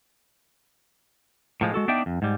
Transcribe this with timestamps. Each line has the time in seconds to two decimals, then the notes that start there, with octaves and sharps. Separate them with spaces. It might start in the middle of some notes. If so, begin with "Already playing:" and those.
1.61 A2 F3 G#3
1.74 G#3 F#4 A4
1.88 B3 D4 D#4 D5 E5 G5
2.06 F2
2.22 G#2 G3